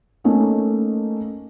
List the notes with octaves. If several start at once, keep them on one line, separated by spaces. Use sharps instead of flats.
A3 A#3 C#4 D#4